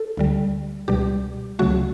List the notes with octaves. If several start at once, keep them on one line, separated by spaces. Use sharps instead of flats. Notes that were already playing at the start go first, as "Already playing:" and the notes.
Already playing: A4
D2 D3 G3
C#2 B2 G3 G4
C#2 C#3 F#3 A3 F#4